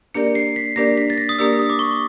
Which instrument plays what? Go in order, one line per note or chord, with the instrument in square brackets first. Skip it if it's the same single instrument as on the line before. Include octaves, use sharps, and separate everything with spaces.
[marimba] A#3 D4 G4 A#4 D5 [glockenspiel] C#7
[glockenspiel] C7
B6
[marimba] A#3 D4 G4 A#4 D5 [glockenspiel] A#6
[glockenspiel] B6
A6
A#6
D#6
[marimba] A#3 D4 G4 A#4 D5 [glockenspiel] E6
[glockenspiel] D#6
D6
C#6